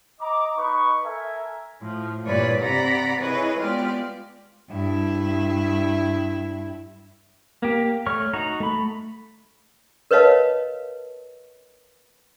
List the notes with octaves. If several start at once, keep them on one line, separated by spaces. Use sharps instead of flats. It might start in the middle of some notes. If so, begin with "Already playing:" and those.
D#5 A#5 D6
D#4 B4 C#6
A4 A#4 E5 G#5 A#5
A2 F3
G2 A#2 E3 B4 C#5 D5
C3 D5 F#5 A#5 B5
E4 G#4 B4 C#5 D#5
G#3 B3 F4 G4 D5
G2 E4
A#3 G4
A3 C#5 C#6 F6
D#4 F#4 A#5
A3 B5
A#4 B4 C#5 D#5 F5 A5